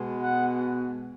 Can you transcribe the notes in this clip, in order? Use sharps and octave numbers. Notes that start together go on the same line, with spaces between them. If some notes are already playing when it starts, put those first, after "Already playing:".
Already playing: B2 G#3 B3
F#5